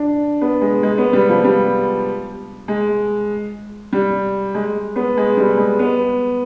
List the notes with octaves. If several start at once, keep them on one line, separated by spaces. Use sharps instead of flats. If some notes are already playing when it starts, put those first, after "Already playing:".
Already playing: D4
B3
G#3
G#3
B3
G3
F3
G3
G#3
G3
G#3
B3
G#3
G3
G#3
B3